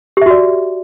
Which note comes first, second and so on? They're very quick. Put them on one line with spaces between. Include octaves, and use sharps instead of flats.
G4 E5 F#4 D5